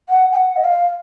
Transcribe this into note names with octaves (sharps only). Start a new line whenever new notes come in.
F#5
G#5
F#5
D#5
F5